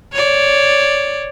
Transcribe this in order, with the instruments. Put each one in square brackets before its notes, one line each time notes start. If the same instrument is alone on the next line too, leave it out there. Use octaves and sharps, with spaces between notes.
[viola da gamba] C#5 D5